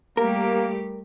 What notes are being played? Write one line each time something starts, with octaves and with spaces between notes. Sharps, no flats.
G3 A3 A#3 G4 A#4